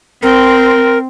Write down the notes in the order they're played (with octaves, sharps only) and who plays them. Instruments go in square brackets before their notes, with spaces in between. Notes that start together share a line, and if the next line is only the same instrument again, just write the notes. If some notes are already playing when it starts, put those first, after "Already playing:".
[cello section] C4 [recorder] A#4